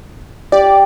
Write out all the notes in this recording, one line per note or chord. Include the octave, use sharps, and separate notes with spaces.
G4 D5